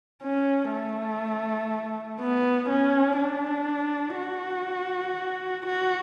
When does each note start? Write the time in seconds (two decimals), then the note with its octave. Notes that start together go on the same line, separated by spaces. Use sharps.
0.23 C#4
0.72 A3
2.20 B3
2.69 C#4
3.18 D4
4.17 F#4
5.66 F#4